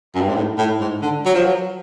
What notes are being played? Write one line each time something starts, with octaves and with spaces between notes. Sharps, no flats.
F#2
G2
G#2
A2
A2
G#2
D3
F#3
F3
F#3